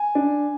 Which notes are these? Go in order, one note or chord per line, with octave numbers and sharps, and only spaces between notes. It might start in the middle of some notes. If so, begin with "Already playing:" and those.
Already playing: G#5
D4